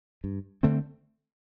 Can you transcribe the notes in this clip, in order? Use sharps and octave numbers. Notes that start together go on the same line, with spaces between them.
G2
D3 A3 C4